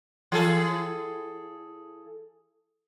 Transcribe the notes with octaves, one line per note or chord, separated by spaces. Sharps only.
E3 G#4 A4